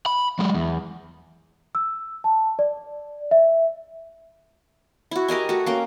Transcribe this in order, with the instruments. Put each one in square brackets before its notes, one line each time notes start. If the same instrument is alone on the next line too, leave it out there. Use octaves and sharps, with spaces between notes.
[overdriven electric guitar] B5
F#3 G#3
E2
[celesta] E6
A5
D5
E5
[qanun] E4 F#4
G4 A#4 D#5 G#5
A3 F#4
A#3 C#4 G5